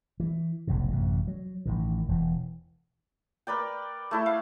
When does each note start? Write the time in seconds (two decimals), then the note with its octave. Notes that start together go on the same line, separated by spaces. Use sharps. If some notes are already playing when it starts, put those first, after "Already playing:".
0.20 E3
0.67 F1 B1 A2 C3
0.91 A1 F#2 C3
1.27 F#3
1.66 A1 A2 D#3
2.08 E1 E3
3.47 A#4 B4 D5 G5
4.11 A3 E4 A4
4.26 F5